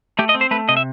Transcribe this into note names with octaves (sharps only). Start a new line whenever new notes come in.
A3 G4
D#5
C4
C5
A3 B4
C3 D#5
E5